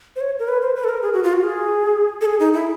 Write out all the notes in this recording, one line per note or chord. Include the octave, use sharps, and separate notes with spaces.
C5
C#5
A#4
B4
C5
B4
A4
A#4
G#4
F#4
F4
F#4
G#4
A4
G#4
D#4
E4